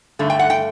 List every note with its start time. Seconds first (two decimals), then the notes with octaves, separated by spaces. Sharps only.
0.19 G2 D3 A3
0.30 G5
0.39 F#5
0.50 G5